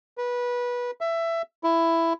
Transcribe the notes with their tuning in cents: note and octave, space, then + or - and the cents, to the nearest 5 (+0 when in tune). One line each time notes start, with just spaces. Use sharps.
B4 -20
E5 +15
E4 +10